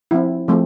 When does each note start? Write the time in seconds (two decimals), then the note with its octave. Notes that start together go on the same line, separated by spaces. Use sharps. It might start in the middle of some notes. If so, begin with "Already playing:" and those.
0.11 F3 C4 E4
0.48 F3 A3 C4